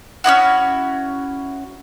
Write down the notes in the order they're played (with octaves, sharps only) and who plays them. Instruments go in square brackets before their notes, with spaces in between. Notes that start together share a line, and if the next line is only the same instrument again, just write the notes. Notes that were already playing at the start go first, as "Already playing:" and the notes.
[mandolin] C#4 D4 E4 F#4